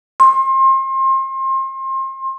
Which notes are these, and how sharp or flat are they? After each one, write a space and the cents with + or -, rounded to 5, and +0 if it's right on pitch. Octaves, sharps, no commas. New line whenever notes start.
C6 +30